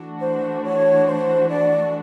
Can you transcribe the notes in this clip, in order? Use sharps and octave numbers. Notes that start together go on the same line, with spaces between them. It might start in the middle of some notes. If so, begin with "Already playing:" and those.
Already playing: E3 A3 D4 F#4
C5
C#5
C5
D5